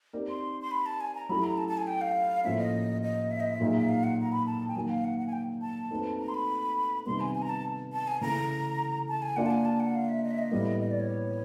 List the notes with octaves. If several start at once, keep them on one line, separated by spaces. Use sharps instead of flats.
C4 D#4 G4 A#4 D5
C6
C6
B5
A5
G#5
A#5
F#3 A3 C#4 E4 G4 B5
A#5
A5
A5
G#5
G5
F5
A2 F3 A#3 C#4 E5
D#5
D#5
E5
D#5
E5
A#2 F#3 A#3 D#4 G#4
E5
F5
F#5
A#5
B5
A5
G5
D#3 F#3 A#3 G#5
F5
F#5
F#5
G#5
G5
A5
A3 C4 D#4 F#4 B4
A#5
C6
B5
C3 D#3 G3 B3 C6
G#5
G#5
A#5
A5
A5
G#5
C#3 E3 A3 A#5
A5
G#5
A#3 D4 F4 F#5
A5
G#5
A5
F#5
F5
E5
D#5
E5
D#5
A2 E3 G3 B3
D#5
D5
C#5